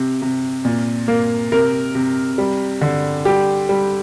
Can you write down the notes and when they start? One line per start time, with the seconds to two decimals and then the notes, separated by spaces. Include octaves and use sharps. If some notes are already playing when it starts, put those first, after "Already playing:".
Already playing: C3
0.22 C3
0.65 A#2
1.08 A#3
1.52 C3 A#4
1.95 C3
2.38 G3
2.81 D3
3.25 G3 G4
3.69 G3